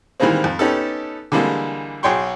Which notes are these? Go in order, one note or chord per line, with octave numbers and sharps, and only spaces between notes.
D#3 E3 G3 G#3 A#3 C4
F2
B3 C#4 D#4 G4 A4
D3 E3 G3 G#3 A#3
B1 G#4 C#5 G5 C6 C#6